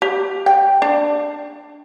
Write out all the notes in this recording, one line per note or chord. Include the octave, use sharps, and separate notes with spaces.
G4
G5
D4